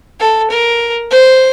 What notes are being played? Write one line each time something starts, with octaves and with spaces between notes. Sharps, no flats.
A4
A#4
C5